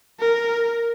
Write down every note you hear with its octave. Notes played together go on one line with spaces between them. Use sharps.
A#4